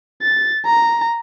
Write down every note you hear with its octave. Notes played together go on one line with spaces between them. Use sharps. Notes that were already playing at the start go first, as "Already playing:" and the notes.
A6
A#5